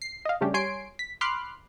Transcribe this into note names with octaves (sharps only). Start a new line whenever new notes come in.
C7
D#5 F5
C#3 G3 A3 C#4 D4 G4
G3 C#5 G#5 C6 C7 D7
B6
B5 C6 D6 F6 F#6 C7